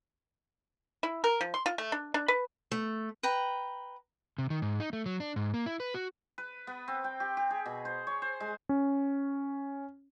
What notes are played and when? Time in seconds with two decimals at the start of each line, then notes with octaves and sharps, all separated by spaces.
1.03 E4
1.24 A#4
1.41 F3
1.54 C6
1.66 F4
1.78 A3
1.92 D4
2.14 D4
2.28 B4
2.72 A3
3.23 B4 G5 A#5
4.38 C3
4.50 D#3
4.62 G#2
4.80 D#4
4.93 A3
5.06 F#3
5.20 D4
5.36 G#2
5.54 A#3
5.66 E4
5.80 B4
5.94 F#4
6.38 B4
6.67 B3
6.88 C4
7.04 G5
7.20 G4
7.37 G4
7.50 G#4
7.66 B2
7.85 C5
8.07 C#5
8.22 C5
8.40 G#3
8.69 C#4